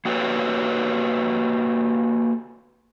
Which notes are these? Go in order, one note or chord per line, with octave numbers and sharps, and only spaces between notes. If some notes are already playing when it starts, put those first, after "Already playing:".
A#3 F#4 G4 A4 B4 C#5